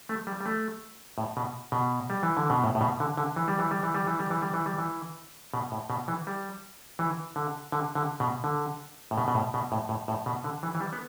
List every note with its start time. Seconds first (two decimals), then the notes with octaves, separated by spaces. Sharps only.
0.09 A3
0.27 G3
0.41 G3
0.46 A3
1.18 A2
1.37 B2
1.72 B2
2.10 G3
2.23 E3
2.37 D3
2.50 B2
2.64 A2
2.75 A2
2.81 B2
3.00 D3
3.17 D3
3.36 E3
3.48 G3
3.59 E3
3.71 G3
3.83 E3
3.94 G3
4.07 E3
4.19 G3
4.30 E3
4.42 G3
4.54 E3
4.66 G3
4.78 E3
5.54 B2
5.72 A2
5.90 B2
6.08 E3
6.27 G3
6.99 E3
7.36 D3
7.72 D3
7.95 D3
8.20 B2
8.44 D3
9.11 A2
9.18 B2
9.28 B2
9.35 A2
9.54 B2
9.72 A2
9.89 A2
10.08 A2
10.26 B2
10.44 D3
10.63 E3
10.75 E3
10.80 G3
10.93 B3